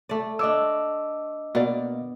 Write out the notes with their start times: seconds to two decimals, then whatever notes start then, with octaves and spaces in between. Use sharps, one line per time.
0.09 A3 D5
0.39 A3 D4 C#5 D#5 D6 E6
1.55 B2 A#3 D5